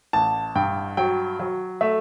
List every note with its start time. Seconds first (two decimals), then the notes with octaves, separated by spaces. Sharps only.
0.13 A1 A5
0.55 G2 G5
0.97 F#3 G5
1.39 F#3
1.81 A3 E5